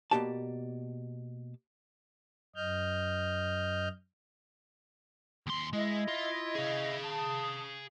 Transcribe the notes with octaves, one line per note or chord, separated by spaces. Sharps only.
B2 G#3 A#3 G4 D5 A5
F#2 D#5 F6 G6
D#2 C6
G#3 E4 D#5
F4
G#4 F5
A5 D#6